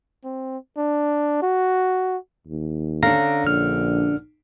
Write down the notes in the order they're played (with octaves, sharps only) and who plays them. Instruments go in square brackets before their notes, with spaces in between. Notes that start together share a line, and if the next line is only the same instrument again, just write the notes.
[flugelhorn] C4
D4
F#4
[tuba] D#2
[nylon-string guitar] D3 C#4 D4 [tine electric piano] F5 A#5 A#6
[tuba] A#1 [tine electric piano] F6